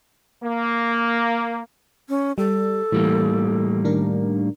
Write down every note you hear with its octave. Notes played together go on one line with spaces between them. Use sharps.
A#3
C#4
G3 A4
A2 E3 G3 A#3
D#3 D4 A#4